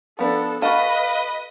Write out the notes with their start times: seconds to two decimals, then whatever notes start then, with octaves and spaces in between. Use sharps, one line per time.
0.19 F3 B3 D4 A4
0.62 F#4 A#4 B4 D#5 F5 A5